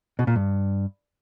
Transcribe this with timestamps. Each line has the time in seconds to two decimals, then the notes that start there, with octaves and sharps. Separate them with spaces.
0.19 B2
0.27 A#2
0.36 G2